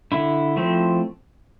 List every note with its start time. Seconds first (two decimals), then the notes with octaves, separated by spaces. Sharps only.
0.12 D3 E4
0.57 F3 A3 C4